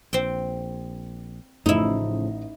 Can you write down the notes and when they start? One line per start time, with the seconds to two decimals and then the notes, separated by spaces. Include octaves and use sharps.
0.13 A#1 C4 G5
1.66 A1 A2 C#3 F3 D#4 E4 D#5